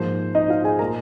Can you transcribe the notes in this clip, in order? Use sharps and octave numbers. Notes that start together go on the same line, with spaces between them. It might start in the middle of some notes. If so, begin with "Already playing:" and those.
Already playing: G#2 F3 A#3 C5
D#4 D#5
F4 F5
G#4 G#5
A#2 G#3 A#4 A#5